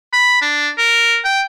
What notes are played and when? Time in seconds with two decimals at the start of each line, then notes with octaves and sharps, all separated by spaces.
0.13 B5
0.42 D4
0.78 A#4
1.25 G5